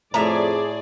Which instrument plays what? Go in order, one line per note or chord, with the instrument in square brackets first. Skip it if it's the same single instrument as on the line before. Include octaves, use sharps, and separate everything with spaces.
[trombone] F2 [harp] A2 [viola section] G#4 D5 [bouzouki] E5 A#5